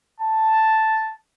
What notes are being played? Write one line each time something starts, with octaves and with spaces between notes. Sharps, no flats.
A5